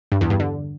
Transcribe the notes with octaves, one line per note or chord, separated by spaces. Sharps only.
G2
E2
G2
D3